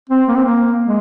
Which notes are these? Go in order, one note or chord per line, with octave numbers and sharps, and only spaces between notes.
C4
A#3
C4
A#3
G#3